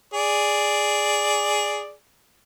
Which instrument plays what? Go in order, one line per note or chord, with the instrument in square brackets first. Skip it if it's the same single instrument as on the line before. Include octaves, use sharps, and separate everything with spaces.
[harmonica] G#4 D5